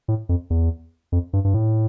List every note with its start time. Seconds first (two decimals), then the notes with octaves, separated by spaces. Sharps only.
0.08 A2
0.29 F2
0.50 E2
1.12 F2
1.33 G2
1.45 G2
1.54 A2